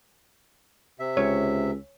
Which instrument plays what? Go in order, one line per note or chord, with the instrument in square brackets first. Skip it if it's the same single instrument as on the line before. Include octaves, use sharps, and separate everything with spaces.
[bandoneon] C3 E5
[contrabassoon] C#2 [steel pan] C#5